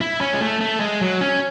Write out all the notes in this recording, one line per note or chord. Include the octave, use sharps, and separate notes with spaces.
E4
C#4
G#3
A3
A3
G#3
F#3
C#4